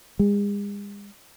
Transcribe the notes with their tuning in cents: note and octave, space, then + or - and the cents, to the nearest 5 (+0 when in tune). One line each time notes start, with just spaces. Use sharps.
G#3 -40